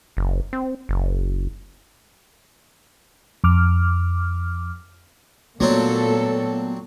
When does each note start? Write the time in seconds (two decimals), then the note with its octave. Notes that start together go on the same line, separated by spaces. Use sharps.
0.17 F#1
0.53 C4
0.89 F#1
3.44 F2 D6 F6
5.60 A#2 F#3 A3 B3 C4 D4 A4